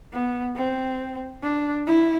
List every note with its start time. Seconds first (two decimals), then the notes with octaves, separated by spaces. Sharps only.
0.13 B3
0.56 C4
1.43 D4
1.86 E4